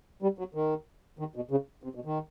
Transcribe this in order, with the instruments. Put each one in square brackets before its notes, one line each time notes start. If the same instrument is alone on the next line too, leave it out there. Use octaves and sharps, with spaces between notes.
[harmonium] G3
F#3
D#3
D#3
B2
C#3
C3
B2
D#3